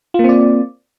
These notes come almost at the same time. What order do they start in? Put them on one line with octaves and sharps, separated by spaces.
F4 A#3 C4 D5